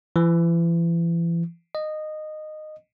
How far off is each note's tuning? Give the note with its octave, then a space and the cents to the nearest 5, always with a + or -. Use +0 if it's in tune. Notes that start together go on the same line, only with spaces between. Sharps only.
E3 +35
D#5 -15